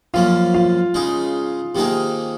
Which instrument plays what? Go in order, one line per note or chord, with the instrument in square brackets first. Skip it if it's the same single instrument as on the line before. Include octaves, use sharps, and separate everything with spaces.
[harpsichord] F#2 F3 A#3 C#4 [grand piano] F4 F5
[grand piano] F4 F5
[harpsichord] C#3 G#3 D#4 G#4
C3 D#3 A#3 D#4 G#4